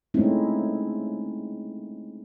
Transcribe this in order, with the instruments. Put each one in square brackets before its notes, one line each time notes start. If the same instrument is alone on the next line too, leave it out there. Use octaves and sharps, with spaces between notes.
[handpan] G#3 A3 C4 C#4 D#4 E4